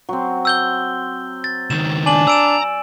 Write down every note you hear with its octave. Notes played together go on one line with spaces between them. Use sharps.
F#3 C4
E6 G6 G7
A6
C#2 D#3 E7
D4 G#5 F#7
D5 A#5 E6 D7 E7